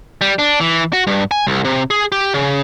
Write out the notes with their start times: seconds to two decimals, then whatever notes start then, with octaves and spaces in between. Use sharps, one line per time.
0.21 G3
0.39 D4
0.60 E3
0.93 F#4
1.07 G2
1.31 G#5
1.47 C2
1.65 C3
1.90 G#4
2.12 G4
2.34 C#3